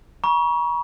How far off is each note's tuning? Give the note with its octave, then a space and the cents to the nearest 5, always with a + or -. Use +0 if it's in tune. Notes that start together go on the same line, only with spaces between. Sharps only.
A#5 +45 C#6 +20